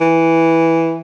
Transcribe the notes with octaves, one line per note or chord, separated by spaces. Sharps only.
E3